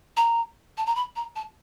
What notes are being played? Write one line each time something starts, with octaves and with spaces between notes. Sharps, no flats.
A#5
A5
A#5
B5
A#5
A5